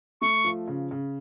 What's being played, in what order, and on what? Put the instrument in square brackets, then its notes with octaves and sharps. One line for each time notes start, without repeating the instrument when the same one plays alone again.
[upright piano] A3 [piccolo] C#6
[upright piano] F3
C#3
C#3